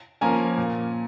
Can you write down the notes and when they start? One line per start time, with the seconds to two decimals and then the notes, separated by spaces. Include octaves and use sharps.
0.21 F3 A#3 C#4 G#5 A#5
0.58 A#2